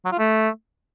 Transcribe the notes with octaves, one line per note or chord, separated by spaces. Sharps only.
F#3
F4
A3